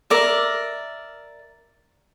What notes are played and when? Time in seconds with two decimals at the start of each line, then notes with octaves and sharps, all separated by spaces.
0.10 A#4 D5 E5